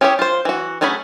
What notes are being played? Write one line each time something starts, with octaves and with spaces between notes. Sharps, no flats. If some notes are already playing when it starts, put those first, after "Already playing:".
C#4 E4 G4 G#4 C#5
F4 C5
E3 F#4
F#3 A3 C#4 G#4 B5